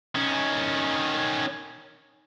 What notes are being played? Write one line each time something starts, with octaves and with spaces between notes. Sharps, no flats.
D#3 C#4